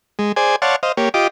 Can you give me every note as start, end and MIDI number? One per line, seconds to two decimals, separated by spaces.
0.19 0.32 56
0.36 0.56 68
0.36 0.56 72
0.36 0.56 74
0.36 0.56 80
0.62 0.76 73
0.62 0.76 74
0.62 0.76 77
0.62 0.76 78
0.62 0.76 81
0.62 0.76 84
0.83 0.92 72
0.83 0.92 75
0.83 0.92 77
0.97 1.09 58
0.97 1.09 67
0.97 1.09 73
1.14 1.28 65
1.14 1.28 67
1.14 1.28 75
1.14 1.28 86